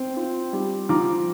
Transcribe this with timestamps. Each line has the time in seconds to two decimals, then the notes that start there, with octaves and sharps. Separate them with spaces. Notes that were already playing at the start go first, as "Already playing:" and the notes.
Already playing: C4 G5
0.17 F4
0.53 G3
0.89 F3 A#5 D6